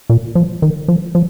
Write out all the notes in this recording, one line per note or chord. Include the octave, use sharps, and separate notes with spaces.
A#2
F3
D#3
F3
F3